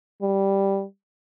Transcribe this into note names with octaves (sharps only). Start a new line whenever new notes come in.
G3